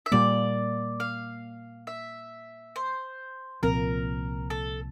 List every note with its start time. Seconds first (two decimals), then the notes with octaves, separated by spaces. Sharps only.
0.06 E5
0.12 A#2 G3 A#3 D5
1.00 F5
1.87 E5
2.76 C5
3.62 C2 A#2 F3 C4 A#4
4.50 A4